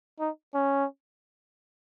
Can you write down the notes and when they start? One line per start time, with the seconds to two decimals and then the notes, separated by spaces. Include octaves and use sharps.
0.20 D#4
0.54 C#4